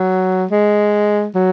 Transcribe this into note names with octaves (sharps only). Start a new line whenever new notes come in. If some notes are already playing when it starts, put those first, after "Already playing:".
Already playing: F#3
G#3
F#3